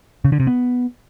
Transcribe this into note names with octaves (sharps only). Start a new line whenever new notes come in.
C#3
D3
C3
B3